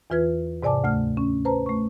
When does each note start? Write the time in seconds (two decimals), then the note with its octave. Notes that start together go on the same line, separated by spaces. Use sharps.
0.10 E2 E3 F4 B4 G#6
0.63 G#2 C3 D5 G#5 A5 D6
0.84 D2 A3 F6
1.17 C#4
1.45 B4 C5 A5 A#5
1.66 A3 C#6